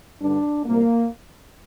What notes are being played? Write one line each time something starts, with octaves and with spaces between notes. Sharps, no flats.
G2 D3 D4
C2 A#2 A#3